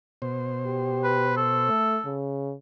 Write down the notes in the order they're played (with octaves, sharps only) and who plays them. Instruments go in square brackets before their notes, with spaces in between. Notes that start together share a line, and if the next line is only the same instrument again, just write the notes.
[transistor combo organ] B2 C5
[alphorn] G4
[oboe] B4
A4
[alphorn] A3
C#3